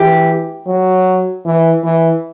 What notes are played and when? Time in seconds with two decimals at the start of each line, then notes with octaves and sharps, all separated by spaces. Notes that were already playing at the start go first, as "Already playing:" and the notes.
Already playing: E3 G4
0.66 F#3
1.45 E3
1.83 E3